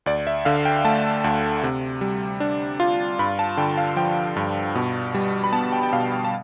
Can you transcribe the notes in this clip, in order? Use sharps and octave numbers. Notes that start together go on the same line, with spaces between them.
D2 D5
E5
D3 F5
G5
A3 A5
D2
C3
G3
D4
F4
G2 B5
A5
D3 G5
F5
F3 G5
G2
B2
G3
B5
B3 A5
G5
G5
B2 F5
G5
A5